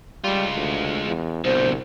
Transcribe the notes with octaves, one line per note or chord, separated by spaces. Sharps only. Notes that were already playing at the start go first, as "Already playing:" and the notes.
G3 G#3 F4
D2
E2
C2 B2 D3 C5